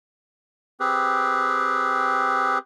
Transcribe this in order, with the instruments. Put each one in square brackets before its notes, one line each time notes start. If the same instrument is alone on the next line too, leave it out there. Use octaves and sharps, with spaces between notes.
[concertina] C4 G4 G#4 B4